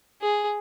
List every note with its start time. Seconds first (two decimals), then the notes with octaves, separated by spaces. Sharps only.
0.21 G#4